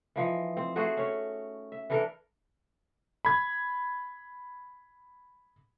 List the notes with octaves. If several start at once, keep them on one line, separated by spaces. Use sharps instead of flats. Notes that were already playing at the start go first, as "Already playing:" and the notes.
E3 F3 D#4
C4
A3 F#4 G#4 C5
C#4 C#5
E5
E3 D4 A4 A#4
B5 G#6